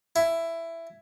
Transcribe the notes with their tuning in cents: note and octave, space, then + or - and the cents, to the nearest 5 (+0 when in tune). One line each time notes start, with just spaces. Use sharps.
E4 +10